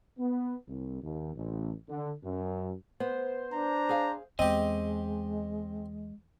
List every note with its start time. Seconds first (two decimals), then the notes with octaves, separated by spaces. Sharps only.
0.18 B3
0.68 C2
1.03 D#2
1.35 A1
1.89 D3
2.24 F#2
3.00 B3 C5
3.53 D4 A#5
3.89 G#4 F5
4.39 E2 G#3 C4 G4 D#5